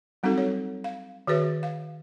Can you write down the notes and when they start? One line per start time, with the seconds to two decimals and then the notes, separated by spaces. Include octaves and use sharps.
0.23 F#3 G3 C4 D#4 F#4 A4
0.38 C#5
0.84 F5
1.27 D#3 F#4 G#4 B4 C#5 E5
1.63 F5